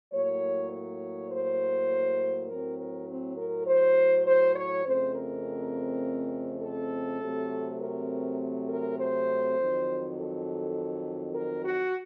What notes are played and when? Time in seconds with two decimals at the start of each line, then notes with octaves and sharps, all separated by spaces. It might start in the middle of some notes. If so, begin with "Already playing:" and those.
0.12 A2 F#3 A#3 C#5
0.72 C#5
1.30 C5
2.49 A2 F#3 C4 A#4
2.79 A#4
3.08 C4
3.38 A#4
3.67 C5
4.26 C5
4.56 C#5
4.85 F2 C#3 A3 C4 C5
5.15 A#4
6.63 A4
7.21 C3 F#3 A3 C4
7.80 A#4
8.69 A#4
8.99 C5
9.58 F2 D#3 F#3
10.17 A4
11.35 A#4
11.65 F#4